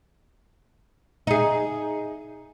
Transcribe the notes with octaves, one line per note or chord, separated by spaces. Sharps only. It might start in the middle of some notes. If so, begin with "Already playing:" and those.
D#4 G#4